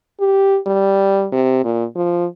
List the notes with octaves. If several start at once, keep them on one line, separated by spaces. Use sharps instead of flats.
G4
G3
C3
A#2
F3